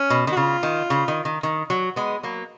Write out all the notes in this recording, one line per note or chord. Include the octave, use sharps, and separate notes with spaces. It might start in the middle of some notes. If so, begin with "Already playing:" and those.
Already playing: C#4
B2
D#3
F#4
C#3 F4
D#3
C#3
D#3
D#3
D#3
F#3
G#3 B3
F#3 A#3